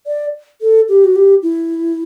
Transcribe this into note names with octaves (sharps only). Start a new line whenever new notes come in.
D5
A4
G4
F#4
G4
E4